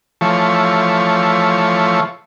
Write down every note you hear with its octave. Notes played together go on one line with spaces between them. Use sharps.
E3 F3 A3 C#5